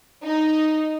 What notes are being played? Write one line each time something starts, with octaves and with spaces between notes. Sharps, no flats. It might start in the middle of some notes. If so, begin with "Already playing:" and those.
D#4